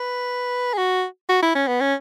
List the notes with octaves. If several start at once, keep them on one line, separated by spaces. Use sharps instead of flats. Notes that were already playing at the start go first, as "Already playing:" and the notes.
Already playing: B4
G#4
F#4
F#4
E4
C#4
B3
C#4